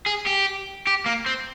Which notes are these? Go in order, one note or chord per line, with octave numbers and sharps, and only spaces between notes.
G#4
G4
G4
A#3
C4